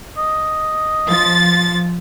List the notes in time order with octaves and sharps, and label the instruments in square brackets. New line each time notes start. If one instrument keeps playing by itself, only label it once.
[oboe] D#5
[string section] F3 A6